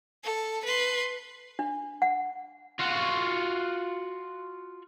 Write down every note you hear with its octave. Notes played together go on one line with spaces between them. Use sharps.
A4
B4 C6
D4
F#5
F4 F#4